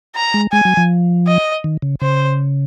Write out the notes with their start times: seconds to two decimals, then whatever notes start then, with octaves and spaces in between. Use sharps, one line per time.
0.15 A#5
0.34 G#3
0.52 G#3 G#5
0.65 F#3
0.77 F3
1.27 D#5
1.64 D#3
1.82 C#3
2.01 C#3 C5